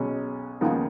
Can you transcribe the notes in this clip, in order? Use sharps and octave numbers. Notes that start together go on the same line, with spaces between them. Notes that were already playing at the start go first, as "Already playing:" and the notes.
Already playing: B1 B2 G#3 C#4
D#2 C#3 F3 B3 D#4